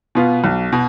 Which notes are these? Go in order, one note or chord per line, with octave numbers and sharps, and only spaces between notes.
B2 B3 F4
B1
B2